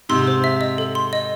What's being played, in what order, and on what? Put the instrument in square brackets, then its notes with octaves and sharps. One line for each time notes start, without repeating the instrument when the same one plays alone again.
[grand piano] G#2 C3 [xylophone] C6
[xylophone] C5
E5
D#5
A4
C6
D#5